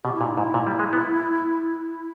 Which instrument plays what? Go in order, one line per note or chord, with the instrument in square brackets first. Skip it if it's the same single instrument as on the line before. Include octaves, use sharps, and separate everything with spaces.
[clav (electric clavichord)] B2 [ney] G4
[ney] E4
[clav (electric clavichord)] A#2
[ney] D#4
[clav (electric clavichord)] G#2 [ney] E4
[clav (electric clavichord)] A#2
G3
G#3
B3